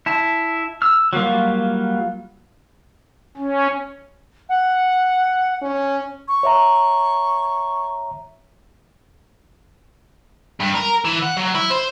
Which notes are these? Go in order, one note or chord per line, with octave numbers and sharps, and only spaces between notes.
E4 A5
E6 F6
F#3 G3 A#3 F4
C#4
F#5
C#4
C#6
C#5 E5 A#5
G2
A#4
E3
F#5
F#3
E4
C5